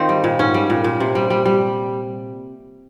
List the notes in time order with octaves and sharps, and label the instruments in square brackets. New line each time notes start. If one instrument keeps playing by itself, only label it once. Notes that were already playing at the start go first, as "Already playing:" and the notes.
Already playing: [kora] D#3 C4 D#4 F4
G3
A#2
G#2 C#4
G3
A#2
A#2
C3
G3
G3
G3